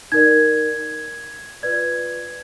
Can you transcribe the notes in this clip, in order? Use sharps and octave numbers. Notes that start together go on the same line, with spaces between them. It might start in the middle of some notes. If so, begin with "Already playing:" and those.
D#4 A#4 D5 G#6
F4 B4 D5 G#6